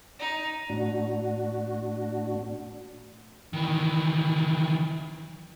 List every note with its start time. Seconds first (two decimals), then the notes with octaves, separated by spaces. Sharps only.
0.19 D#4
0.69 A2 D4 F#4
3.53 D#3 E3